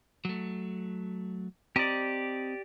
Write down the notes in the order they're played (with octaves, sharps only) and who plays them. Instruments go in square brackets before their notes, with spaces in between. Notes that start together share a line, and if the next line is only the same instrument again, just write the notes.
[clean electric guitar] F#3 A3
[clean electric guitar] C4 D#5 A#5 [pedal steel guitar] G4 D5